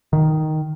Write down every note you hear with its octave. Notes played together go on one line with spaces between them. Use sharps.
D#3